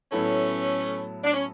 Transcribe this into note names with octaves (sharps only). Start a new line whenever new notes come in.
A2 F#3 A3 B3 C#4 E4 A4
D4
C#4